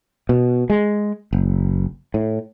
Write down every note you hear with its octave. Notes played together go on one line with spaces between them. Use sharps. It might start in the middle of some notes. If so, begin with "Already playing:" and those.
B2
G#3
F#1
A2